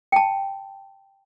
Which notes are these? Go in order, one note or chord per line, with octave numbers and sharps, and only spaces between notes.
G5 A5